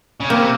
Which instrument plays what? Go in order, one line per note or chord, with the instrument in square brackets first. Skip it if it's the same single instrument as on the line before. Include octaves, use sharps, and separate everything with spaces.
[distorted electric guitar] C#3
[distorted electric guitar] C3 [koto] A#3